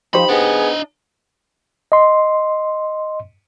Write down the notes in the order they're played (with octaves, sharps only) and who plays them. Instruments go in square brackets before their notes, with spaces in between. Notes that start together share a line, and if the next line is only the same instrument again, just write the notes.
[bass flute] F3 [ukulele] D#4 G4 C5 [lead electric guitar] B5
[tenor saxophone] B3 [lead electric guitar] D4 D#5 [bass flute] G#4
[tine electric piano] D#5 C6